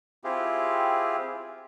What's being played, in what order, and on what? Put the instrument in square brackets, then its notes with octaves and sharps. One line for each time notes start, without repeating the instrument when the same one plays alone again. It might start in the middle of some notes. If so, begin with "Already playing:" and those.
[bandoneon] C4 E4 F4 G4 G#4